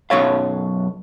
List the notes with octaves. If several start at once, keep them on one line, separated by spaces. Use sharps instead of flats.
B1 F#2 C#5 F5